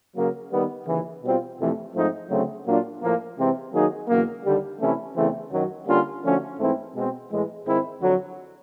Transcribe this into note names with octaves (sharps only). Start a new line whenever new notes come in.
C#3 F#3 A#3
D#3 G3 B3
D#2 C#3 E3
B2 G3 C4 F4
F2 C3 E3 A3
G#2 F3 A3 C4 D#4
D2 C#3 F#3 A3 C4
A#2 F#3 A#3 D4 F4
A2 F3 A#3
C3 E3 G#3 C4
D#3 F#3 A#3 D#4 G#4
E2 C#3 F#3 A#3
D#2 D3 G3
C3 E3 A3 C#4 E4
E2 C#3 E3 A3 C4
F#2 D#3 F#3
D3 G3 A#3 C#4 F4
D3 F3 A3 C#4 F#4
G#2 E3 A3 C4 E4
B2 G#3 C4
A2 E3 G#3
G#2 D#3 G#3 C4 E4
F2 D3 F#3